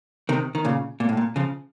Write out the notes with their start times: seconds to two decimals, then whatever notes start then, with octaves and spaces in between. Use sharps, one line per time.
0.29 C3 D#3
0.55 D#3
0.65 A#2 C#3
1.00 A#2
1.09 A2
1.17 A#2
1.36 C#3 F3